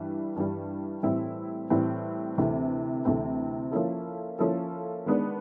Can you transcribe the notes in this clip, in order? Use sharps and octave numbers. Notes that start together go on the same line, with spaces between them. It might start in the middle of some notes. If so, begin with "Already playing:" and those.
Already playing: G2 E3 G3
G2 E3 G3
A2 E3 G3 C4 E4
A2 E3 G3 C4 E4
D2 C3 E3 A3 C4
D2 C3 E3 A3 C4
F3 A#3 C#4 E4 A4
F3 A#3 C#4 E4 A4
D#3 G#3 B3 D4